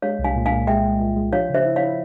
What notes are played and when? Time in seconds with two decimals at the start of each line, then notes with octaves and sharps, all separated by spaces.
0.02 G#3 C#5 F5
0.19 C2
0.24 F5 G#5
0.35 A#2
0.46 F5 G#5
0.52 A#2
0.67 G#3 E5 G5
0.84 G#3
1.00 A#2
1.16 G#3
1.33 F3 C#5 F5
1.49 C#3
1.54 C5 E5
1.65 E4
1.76 C#5 F5
1.82 E4